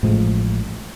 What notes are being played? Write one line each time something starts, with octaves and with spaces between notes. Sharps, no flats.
A1 A2 F3 G#3